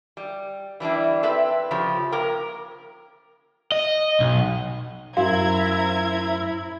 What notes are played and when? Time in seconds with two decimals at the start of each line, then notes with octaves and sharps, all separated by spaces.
0.17 G3
0.80 E3 G3 D4 E4
1.23 C4 A4 B4 E5
1.71 C#3 F3 G4
2.12 A#3 A#4 G5
3.72 D#5
4.20 B1
5.17 F#2 A2 E4 F#4 C5 F5 A#5 G#6